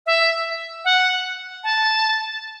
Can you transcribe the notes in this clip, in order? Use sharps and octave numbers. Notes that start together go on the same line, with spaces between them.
E5
F#5
A5